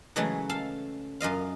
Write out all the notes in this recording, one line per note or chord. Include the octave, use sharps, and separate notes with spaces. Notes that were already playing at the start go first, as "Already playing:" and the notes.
C#3 E3 F#3 G#3 A3
A4 F5 A5
F#2 F4 D#5 F5